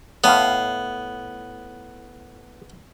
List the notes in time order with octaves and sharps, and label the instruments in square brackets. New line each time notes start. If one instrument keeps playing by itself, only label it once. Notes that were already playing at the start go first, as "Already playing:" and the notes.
[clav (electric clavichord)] A2 F5 [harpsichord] B3